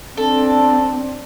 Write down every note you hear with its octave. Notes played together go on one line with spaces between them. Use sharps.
C4 D4 A4